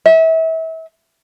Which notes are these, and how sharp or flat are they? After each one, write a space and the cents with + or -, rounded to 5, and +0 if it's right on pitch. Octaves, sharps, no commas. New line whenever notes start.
E5 -30